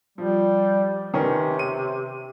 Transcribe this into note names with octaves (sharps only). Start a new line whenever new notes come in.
F3 G3
C3 D#3 B3 C#4
D#7